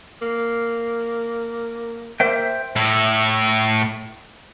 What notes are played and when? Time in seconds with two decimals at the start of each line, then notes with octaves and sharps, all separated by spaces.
0.22 A#3
2.20 A#3 C5 E5 G5
2.76 A2 E4